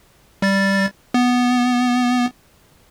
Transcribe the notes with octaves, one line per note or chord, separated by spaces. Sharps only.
G3 A6
B3